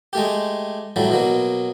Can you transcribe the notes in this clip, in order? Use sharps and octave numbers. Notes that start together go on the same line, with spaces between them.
G#3 A3 G4
A2 F#3 G3 A3
B2 F#3 A#3